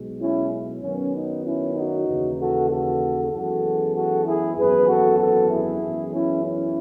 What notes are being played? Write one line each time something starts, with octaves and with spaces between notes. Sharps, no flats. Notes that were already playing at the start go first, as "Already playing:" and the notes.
Already playing: B1 B2 G#3
C#4 E4
F#2 D#3 F#3 B3 C#4
D#4
C#4 E4
D#4 F#4
D#2 C#3 E3
F#4 A4
F#4 A4
F#2 E3 G#3 B3 F#4 A4
F#4 A4
E4 G#4
G#1 F#2 E3 B3 G#4 B4
F#4 A4
F#4 A4
E4 G#4
F#2 E3 G#3 B3
C#4 E4
C#4 E4